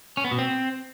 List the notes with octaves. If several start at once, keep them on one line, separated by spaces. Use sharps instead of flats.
C#4
B3
B2
C4